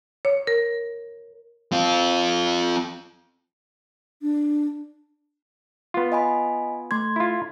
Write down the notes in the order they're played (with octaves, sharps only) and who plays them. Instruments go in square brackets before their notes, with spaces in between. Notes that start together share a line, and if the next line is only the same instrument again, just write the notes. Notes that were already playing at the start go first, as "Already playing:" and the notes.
[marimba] C#5
A#4
[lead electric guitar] C4 F4
[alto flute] D4
[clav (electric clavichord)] B3 F4
[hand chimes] D#5 G#5 B5
A3 C6 G#6
[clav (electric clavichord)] E4 F4